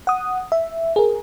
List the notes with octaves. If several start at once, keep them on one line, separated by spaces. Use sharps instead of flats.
F#5 D#6
E5
G#4 A#4